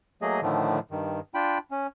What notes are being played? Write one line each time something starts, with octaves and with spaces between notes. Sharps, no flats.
F#3 A3 A#3 G#4 D#5
A2 D3 D#3 F3 A3
G2 D#3
D4 F4 G5 B5
C#4